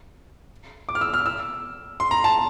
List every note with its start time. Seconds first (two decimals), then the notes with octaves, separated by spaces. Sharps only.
0.89 D6
0.95 F6
1.01 E6
1.14 F6
1.26 E6
2.00 C6
2.11 A#5
2.24 A5